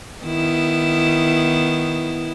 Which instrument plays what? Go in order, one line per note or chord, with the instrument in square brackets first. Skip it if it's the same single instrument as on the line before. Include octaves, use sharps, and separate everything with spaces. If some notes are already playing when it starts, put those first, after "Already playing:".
[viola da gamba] D#3 B3 E4